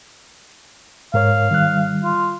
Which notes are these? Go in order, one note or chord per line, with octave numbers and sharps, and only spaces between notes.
G#2 A#4 C#5 F5
D#3 G3 F#6
F4